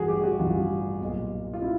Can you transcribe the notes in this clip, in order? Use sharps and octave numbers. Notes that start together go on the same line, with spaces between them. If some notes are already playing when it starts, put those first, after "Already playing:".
Already playing: A1 G2 E3 F#4 G#4
G4
F#4
A1 G2 E3 F4
B1
A#2
F4
E4